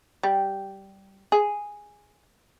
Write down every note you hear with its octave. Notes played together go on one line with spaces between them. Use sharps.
G3
G#4